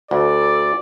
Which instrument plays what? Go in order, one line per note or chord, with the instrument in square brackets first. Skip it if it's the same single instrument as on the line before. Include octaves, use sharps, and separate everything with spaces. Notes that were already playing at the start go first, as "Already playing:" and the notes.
[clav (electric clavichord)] D2 [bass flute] A4 [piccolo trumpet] D5